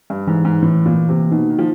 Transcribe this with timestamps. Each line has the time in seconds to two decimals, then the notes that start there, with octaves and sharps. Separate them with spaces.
0.10 G2
0.27 G#2 E3
0.45 G#2
0.62 A2 E3
0.86 A#2
0.97 A#3
1.09 C3
1.32 B2 D#4
1.50 D#3
1.59 F3